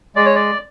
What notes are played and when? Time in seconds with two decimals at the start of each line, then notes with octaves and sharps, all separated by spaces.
0.15 G#3 D5
0.25 C#5
0.35 D5